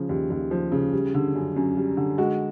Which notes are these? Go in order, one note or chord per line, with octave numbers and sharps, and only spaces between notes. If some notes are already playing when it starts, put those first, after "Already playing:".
Already playing: C#3 F3
D#2
D#2
F3
C#3
G3
D3
F#2
F#2
G3
D3
G#3 F#4